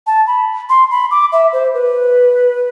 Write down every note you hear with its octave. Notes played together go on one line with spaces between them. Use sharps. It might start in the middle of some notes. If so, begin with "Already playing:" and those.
A5
B5
C6
B5
D6
E5
C5
B4